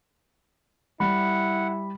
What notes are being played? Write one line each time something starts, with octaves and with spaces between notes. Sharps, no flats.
G3 E4 F#5 B5